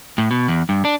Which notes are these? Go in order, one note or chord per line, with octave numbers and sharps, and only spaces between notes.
A2
B2
E2
G2
D4